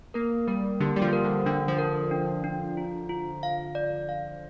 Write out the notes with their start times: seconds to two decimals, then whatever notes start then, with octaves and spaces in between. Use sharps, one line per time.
0.14 A#3 A#4
0.47 G3 A#4
0.80 D3 G4
0.96 G3
1.02 F3
1.13 A#4
1.24 D3
1.46 D3 D4
1.68 F3
1.78 A#4
2.11 D4
2.44 D4
2.77 F4
3.09 F4
3.43 F5
3.75 D5
4.09 F5